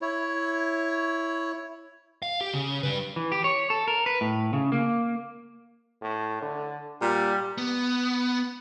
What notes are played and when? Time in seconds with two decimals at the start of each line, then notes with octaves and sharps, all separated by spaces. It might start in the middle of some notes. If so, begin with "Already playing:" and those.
0.02 E4 C#5
2.22 F5
2.41 G4
2.53 C#3
2.83 G3 B4
3.16 E3
3.32 G4
3.44 C#5
3.70 A4
3.88 A#4
4.06 B4
4.21 A2
4.53 C#3
4.72 A#3
6.02 A2
6.42 D3
7.01 A#2 G3
7.58 B3